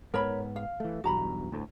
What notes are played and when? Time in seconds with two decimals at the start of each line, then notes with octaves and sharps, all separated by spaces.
0.14 G#2 B3 A#4 C#5 B5
0.56 F5
0.80 E3 A3
1.04 B1 E2 G2 F#4 A#5 B5
1.52 D2 A2